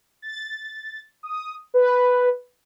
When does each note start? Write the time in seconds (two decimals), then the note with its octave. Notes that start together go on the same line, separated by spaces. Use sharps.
0.22 A6
1.23 D#6
1.74 B4